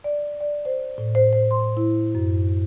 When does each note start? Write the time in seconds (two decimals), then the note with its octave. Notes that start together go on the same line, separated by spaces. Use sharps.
0.04 D5
0.41 D5
0.65 C5
0.98 A2
1.15 C5
1.33 C5
1.51 C6
1.77 E4
2.15 F#2